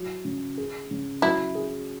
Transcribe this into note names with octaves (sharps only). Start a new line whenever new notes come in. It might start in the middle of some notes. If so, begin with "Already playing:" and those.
Already playing: F#3 E4
C#3
G#4
C#3
F#3 E4
G#4